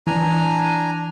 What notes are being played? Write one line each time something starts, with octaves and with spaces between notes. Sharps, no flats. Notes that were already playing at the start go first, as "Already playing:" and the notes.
E3 D4 G#5 A#5